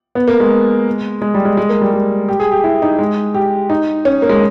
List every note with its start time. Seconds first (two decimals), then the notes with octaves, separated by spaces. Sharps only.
0.15 B3
0.28 A#3
0.40 G#3
1.22 G#3
1.34 G3
1.45 G#3
1.57 G#3
1.69 A#3
1.81 G3
1.93 G#3
2.28 G4
2.40 G#4
2.52 G4
2.64 E4
2.82 D#4
2.99 G#3
3.34 G4
3.70 D#4
4.05 C#4
4.22 A#3
4.29 G#3